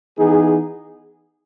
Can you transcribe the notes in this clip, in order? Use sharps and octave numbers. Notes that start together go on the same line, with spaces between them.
E3 B3 D#4 G#4